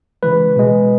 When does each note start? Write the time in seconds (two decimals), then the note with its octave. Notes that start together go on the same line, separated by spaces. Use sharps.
0.23 C#3 E3 G#3 B4
0.56 B2 G#3